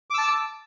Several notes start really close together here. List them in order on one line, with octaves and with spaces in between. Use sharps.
D6 E6 A5